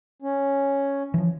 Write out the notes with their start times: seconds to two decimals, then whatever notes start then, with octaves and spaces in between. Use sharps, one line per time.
0.22 C#4
1.14 E3 F3